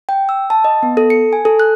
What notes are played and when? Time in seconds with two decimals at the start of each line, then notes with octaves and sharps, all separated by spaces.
0.09 G5
0.29 E6
0.50 A5
0.64 D#5
0.83 B3
0.97 A4
1.10 C#7
1.33 G#5
1.45 A4
1.60 F#6